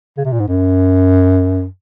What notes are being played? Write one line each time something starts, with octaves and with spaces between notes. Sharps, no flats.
C#3
C3
A#2
G#2
F#2